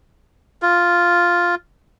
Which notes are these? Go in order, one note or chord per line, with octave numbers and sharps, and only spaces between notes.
F4